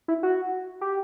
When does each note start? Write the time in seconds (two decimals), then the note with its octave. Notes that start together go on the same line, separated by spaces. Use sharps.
0.08 E4
0.23 F#4
0.81 G4